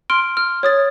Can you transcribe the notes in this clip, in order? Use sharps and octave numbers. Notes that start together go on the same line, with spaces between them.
C6 F6 D7
F6
C#5 D#6 A6